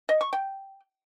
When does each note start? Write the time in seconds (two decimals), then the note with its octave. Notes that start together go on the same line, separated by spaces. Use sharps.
0.09 D#5
0.21 C#6
0.33 G5